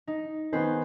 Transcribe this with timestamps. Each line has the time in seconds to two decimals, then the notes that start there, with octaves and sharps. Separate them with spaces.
0.07 D#4
0.53 D#3 B3 G#4 B4 C5